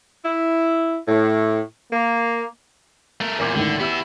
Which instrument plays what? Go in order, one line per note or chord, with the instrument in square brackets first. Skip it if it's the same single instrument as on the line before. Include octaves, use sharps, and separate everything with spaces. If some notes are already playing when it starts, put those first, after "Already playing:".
[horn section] E4
A2
A#3
[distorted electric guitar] A3 A#4
[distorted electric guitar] E2 A#2 [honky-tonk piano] A#4 D6 G6
[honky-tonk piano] C#2 A2 D#3 [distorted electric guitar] D3
[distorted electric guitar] B3 E4 [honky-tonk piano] G4 E6